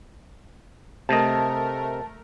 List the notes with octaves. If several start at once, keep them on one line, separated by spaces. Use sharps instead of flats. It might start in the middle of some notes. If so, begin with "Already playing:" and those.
C3 A3 A#4 D#5 A5